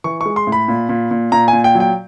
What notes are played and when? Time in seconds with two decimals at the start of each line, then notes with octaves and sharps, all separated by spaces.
0.04 E3 C#6
0.21 G#3 C#6
0.36 C6
0.47 A2
0.52 B5
0.68 A#2
0.89 A#2
1.11 A#2
1.32 A#2 A#5
1.48 G#5
1.53 A#2
1.64 G5
1.75 F#3
1.80 G5